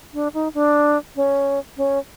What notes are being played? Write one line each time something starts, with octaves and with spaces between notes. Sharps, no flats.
D4
D#4
D4
C#4
C#4